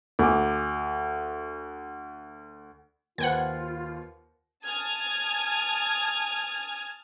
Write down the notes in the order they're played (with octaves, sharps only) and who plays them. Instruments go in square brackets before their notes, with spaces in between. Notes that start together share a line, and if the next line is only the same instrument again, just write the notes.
[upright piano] D2 D6
[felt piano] D#2 B4 C5 [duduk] F4 [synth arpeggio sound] F#5 G5 G#6
[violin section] G#5 A5 D#6 F6 G#6